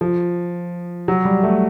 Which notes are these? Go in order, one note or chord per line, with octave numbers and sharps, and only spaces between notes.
F3
F#3
G3
A3